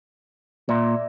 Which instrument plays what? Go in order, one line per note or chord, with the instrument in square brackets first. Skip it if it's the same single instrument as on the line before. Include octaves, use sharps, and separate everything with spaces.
[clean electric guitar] A#2 [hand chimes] D5 E5